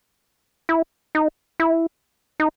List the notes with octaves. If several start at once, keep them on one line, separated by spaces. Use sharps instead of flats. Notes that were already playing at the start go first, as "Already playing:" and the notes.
E4
D#4
E4
D#4